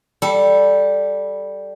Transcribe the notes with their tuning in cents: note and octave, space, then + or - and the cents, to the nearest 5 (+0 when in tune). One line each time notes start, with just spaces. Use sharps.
G3 +0 A4 +0